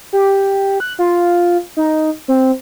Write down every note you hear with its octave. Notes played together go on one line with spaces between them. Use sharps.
G4
F#6
F4
D#4
C4